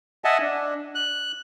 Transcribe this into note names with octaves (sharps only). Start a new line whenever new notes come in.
D#5 E5 F#5 G#5 A5
D4
F#6